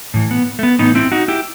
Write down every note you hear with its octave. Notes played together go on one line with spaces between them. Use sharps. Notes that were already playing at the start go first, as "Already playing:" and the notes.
A2 E3
B3
A3
B3
A2 E3 B3 D#4
C4 E4
D#4 F#4
E4 G4